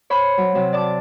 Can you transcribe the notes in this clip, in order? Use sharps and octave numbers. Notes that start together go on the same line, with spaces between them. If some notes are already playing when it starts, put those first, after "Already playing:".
C5 C#5 B5 C#6
F#3
C3 F#3
D5 A5 D6